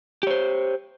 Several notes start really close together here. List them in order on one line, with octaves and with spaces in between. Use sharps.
G4 C#5 C5